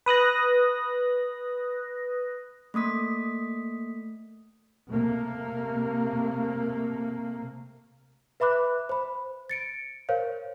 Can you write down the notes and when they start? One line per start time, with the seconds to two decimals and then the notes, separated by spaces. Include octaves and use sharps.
0.06 B4 D#6 F#6 A#6
2.74 A3 A#3 D#6 B6
4.88 C3 A3 A#3
8.40 B4 E5 B5 D6 F#6
8.89 C5 B5
9.50 A6 C#7 D7
10.09 A#4 C5 C#5 F5